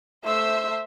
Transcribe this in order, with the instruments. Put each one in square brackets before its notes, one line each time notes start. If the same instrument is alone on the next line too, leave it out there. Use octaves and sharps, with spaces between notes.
[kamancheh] A3 E6 [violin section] C5 E5 C6